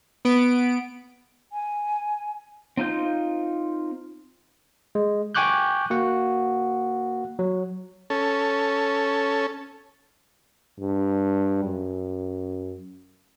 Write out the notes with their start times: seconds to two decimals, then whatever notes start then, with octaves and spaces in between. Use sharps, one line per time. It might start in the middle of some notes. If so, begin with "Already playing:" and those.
0.25 B3 D7
1.52 G#5
2.77 C4 D#4 F4 G6
4.95 G#3
5.35 G5 G#5 C#6 D6 F#6 G6
5.90 A#3 F#4 F#5
7.39 F#3
8.10 C#4 A4
10.79 G2
11.64 F#2